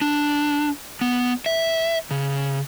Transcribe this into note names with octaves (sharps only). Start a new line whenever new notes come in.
D4
B3
E5
C#3